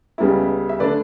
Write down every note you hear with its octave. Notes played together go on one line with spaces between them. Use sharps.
C#2 C#3 G3 B3 E4
E5
D3 A3 D4 B4 D5